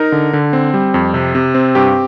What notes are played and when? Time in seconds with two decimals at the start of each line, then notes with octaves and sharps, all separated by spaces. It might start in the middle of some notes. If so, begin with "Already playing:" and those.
Already playing: D#4 A#4
0.12 D3
0.33 D3
0.53 C4
0.74 G3
0.94 F2
1.14 C3
1.35 C3
1.54 C4
1.75 G2 G4